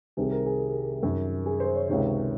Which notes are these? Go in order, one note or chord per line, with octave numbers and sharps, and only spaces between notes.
C2 C3 D#3 G#4
A#4
G#4
F#2 D#3
G#4
C5
C#5
C#2 C3 D#3 C#5